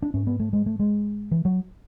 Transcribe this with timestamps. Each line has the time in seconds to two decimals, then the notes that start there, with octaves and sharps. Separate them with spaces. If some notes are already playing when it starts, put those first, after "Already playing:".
0.02 D4
0.14 G#2 C#4
0.27 B3
0.40 A3
0.53 G#3
0.66 A3
0.79 G#3
1.31 E3
1.45 F#3